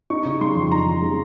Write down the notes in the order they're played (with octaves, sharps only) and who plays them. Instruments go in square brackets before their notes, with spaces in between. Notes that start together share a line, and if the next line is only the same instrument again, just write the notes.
[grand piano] D#4 [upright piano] C#6
[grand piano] C#3
[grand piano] G#3 [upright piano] C6
[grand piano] F2
[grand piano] D#4 [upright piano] A#5
[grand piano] C#3
G#3